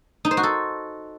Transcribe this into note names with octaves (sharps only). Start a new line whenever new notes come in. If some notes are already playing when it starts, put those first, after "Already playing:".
D#4
C5
F#4
A4